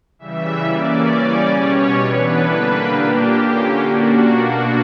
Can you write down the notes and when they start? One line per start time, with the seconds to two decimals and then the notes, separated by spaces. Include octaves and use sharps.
0.19 C#3 E3 G3 E5
0.63 E3 A#3 C#4 D5
1.09 C#3 G3 C#4
1.54 B2 G3 C#4 C#5
1.98 E3 B3 D4 B4
2.43 D3 G3 A#3 D4 B4
2.88 A#2 A#3 D4 G4
3.33 D3 A#3 C#4
3.79 A#2 A#3 D4 F#4
4.23 B2 A#3 D4 F#4